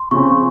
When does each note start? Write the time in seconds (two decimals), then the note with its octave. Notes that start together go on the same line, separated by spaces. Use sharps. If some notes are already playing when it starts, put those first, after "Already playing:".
Already playing: C6
0.11 C#3 F3 C4 C#6